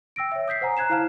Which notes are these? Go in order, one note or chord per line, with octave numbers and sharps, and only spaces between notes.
G5 E6 A#6 D7
C#5 E5
D#6 G6 B6 C7
C5 F#5 G#5 A#5
A#5 F#6 G#6 C7 E7
E4 C5 F5 A5 F6 E7